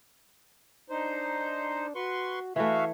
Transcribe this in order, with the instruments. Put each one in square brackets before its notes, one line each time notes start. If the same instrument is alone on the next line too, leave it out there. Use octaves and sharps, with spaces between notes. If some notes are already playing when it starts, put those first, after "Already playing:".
[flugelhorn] D4 [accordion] D#4 C5
[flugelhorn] F#4 [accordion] B4 C6 C#6
[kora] E3 A3 [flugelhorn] E4 [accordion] F#4 E5 F5